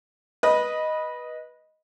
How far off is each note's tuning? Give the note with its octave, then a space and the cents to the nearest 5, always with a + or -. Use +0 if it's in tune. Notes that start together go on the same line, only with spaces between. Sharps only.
B4 -15 D#5 +0